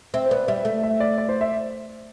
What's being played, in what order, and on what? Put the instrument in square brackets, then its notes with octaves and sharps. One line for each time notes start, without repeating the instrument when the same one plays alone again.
[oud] C4 [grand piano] E5
[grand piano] C5
[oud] B3 [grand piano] D5
[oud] G3 [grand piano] E5
[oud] A3
[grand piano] E5
D5
D5
C5
E5